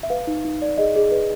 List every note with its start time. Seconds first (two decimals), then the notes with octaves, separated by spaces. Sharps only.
0.03 E5
0.10 B4 F5
0.27 D#4
0.45 D#4
0.62 D5
0.78 G#4 D#5
0.96 G#4
1.11 B4